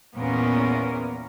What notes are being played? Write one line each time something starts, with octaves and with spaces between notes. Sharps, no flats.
E2 A#2 A#3 B3 C#4 A#4